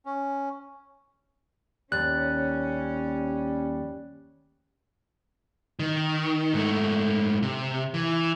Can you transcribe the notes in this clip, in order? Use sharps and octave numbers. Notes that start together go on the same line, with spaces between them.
C#4
D#2 G3 C#4 F#6 A6
D#3
G#2 A3
C3
E3